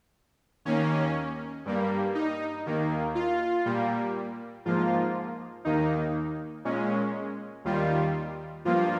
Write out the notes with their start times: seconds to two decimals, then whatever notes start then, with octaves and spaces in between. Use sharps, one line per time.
0.65 D#2 D#3 A#3 C#4
1.65 G2 G3 A#3
2.15 D#4
2.66 D#2 D#3 A#3
3.15 F4
3.66 A#2 G3 A#3
4.65 G#2 F3 A#3 F4
5.65 D#2 D#3 A#3 D#4
6.65 A#2 G#3 C#4
7.65 D#2 D#3 G3 F4
8.65 G2 F3 A#3 F4